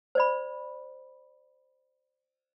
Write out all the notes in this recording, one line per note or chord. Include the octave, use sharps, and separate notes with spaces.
C5 D5 B5